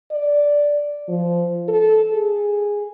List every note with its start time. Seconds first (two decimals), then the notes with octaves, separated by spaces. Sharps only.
0.11 D5
1.08 F3
1.68 A4
2.13 G#4